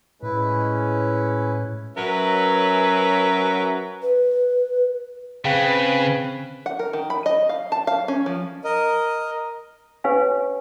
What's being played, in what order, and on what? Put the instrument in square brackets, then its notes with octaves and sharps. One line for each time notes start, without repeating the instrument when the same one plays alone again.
[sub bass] A2 [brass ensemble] G#3 C#4 [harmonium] E4 B4
[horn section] F#3 C#4 A#4 B4 C#5 E5
[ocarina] B4
[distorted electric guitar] C#3 [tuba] C4 [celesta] G#4 F5 G5 [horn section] B4
[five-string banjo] F#5
A#4
D#3
B5
D#5
F5
A5
F5
C#4
F3
[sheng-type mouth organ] A#4 D#5
[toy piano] C#4 G4 B4 C#5 F5 G#5